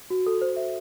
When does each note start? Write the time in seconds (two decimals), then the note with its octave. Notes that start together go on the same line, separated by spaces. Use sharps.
0.10 F#4
0.26 A4
0.41 C5
0.56 E5